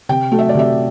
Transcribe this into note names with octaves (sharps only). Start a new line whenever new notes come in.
C3 G5
F#3 A3
E5
D5
C3 E5